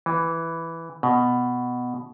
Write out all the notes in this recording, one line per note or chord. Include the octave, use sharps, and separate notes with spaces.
E3
B2